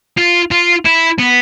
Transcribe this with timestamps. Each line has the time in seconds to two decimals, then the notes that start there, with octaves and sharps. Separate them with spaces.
0.18 F4
0.51 F4
0.85 E4
1.18 B3